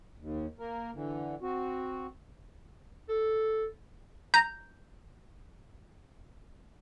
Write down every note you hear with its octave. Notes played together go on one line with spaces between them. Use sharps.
D#2
A#3 A#4
D3 E3
C4 F#4
A4
A#5 G6